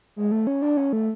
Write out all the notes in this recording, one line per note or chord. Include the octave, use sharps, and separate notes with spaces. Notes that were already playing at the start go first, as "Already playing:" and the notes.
G#3
A3
C#4
D4
C#4
A3